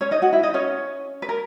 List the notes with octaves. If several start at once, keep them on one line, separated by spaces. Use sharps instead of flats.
C#4 C#5
D#4 D#5
F#4 F#5
E4 E5
D#4 D#5
C#4 C#5
B4
A#4